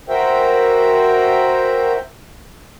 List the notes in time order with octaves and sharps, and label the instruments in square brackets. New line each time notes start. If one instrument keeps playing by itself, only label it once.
[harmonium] F#4 A#4 C5 E5 G5